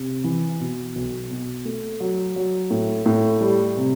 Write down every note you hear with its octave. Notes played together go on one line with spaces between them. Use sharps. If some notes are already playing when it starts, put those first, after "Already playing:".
Already playing: C3
E3
B2
B1
B2
A3
F#3
F#3
A2
A2
G3
C3